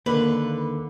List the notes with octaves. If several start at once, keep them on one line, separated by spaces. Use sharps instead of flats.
D#2 D3 A#3 B4